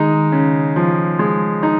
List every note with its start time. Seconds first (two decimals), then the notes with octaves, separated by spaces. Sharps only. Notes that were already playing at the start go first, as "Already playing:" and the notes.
Already playing: D#3 G#3 D#4
0.32 C#3
0.76 F3
1.19 G#3
1.63 D#4